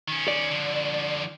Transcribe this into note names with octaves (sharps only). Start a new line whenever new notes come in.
D#3 C#4
D5
D3 F3